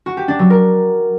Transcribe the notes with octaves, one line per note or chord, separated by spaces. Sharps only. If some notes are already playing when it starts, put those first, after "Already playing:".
F#4
G4
D4
F#3
A#4